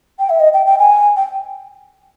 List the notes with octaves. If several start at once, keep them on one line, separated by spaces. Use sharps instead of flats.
G5
E5
D#5
G5
G5
G#5
G5